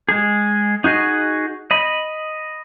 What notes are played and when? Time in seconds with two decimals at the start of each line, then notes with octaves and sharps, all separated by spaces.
0.09 G#3 G#4
0.84 D#4 F#4 G#4 D#5
1.71 D#5 B5